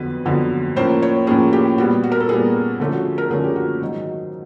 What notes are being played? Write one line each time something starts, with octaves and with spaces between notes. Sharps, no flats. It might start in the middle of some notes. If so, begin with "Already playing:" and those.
Already playing: F2 D3 F#3 B3 B4
F2 D3 F#3 B3
A2 F3 A#3 C#4 C5
C#5
A2 F3 A#3 C#4 G#4
G4
A#2 G3 B3 F#4
F#4
A#4
A4
A#2 G3 B3 G#4
D3 F3 A3 C#4
F#4
G#4
A#4
D3 F3 A3 C#4 G#4
G4
F#4
G#2 D#3 F#3